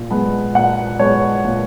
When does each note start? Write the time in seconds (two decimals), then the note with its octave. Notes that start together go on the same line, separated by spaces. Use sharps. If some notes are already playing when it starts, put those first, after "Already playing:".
Already playing: A#2
0.11 G#3 B3
0.55 A#2 F#5
0.99 G#3 B3 C#5
1.44 A#2